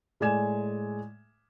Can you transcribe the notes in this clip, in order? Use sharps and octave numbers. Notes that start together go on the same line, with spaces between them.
A2 G#3 D5 G#5 G#6 E7